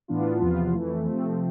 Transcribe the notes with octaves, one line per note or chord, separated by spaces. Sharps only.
A2 E3 B3 D4 F4
E2 C3 F3 B3 F4
F2 E3 A3
C3 F3 A3 C4